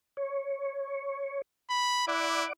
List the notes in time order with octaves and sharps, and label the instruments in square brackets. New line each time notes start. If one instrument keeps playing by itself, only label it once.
[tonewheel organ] C#5
[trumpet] B5
[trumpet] E4 [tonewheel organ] D5 F#5 D6